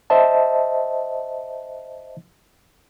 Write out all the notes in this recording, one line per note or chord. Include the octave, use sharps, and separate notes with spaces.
C5 D#5 E5 A5